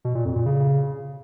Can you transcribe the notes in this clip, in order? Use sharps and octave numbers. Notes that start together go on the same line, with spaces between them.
B2
A#2
F2
A#2
C#3